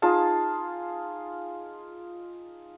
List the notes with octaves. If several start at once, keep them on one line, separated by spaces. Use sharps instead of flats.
D#4 F4 G#4 A5